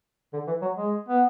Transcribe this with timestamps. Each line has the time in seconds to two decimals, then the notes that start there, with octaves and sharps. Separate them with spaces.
0.33 D3
0.47 E3
0.61 F#3
0.77 G#3
1.09 B3